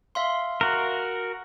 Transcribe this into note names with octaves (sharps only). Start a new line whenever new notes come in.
E5 F5 C6
F#4 A#4